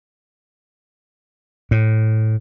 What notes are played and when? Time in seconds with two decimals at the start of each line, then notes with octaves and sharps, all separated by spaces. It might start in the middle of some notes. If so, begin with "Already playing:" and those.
1.71 A2